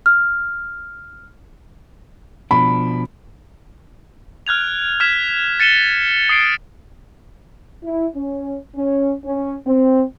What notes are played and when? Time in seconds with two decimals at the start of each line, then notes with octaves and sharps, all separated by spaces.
0.06 F6
2.51 B2 F3 D4 B5
4.47 F6 F#6 G#6 F7
5.00 F6 G#6 B6 E7
5.60 A6 C#7 D#7 E7 G7
6.29 D#6 C7 D7
7.84 E4
8.15 C#4
8.75 C#4
9.25 C#4
9.66 C4